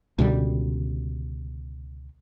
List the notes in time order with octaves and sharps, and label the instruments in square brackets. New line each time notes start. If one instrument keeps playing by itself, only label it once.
[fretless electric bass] C#2 B2 D3 G3